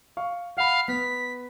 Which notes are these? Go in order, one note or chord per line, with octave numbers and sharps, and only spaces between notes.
F5 C#6
F5 F#5 B5
B3 B6